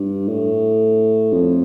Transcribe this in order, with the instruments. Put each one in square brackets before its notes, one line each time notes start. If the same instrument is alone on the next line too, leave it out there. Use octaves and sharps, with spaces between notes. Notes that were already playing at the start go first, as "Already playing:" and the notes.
Already playing: [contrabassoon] G2
A2
F2